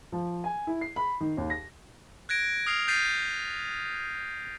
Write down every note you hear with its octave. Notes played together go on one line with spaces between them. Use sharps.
F3
G#5
E4
C7
B5
D#3
D#2
A#6
F#6 G#6 A#6 D7
D#6 F6 C7 F7
G6 A6 B6 C7 D#7